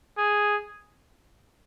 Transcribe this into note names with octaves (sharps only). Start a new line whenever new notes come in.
G#4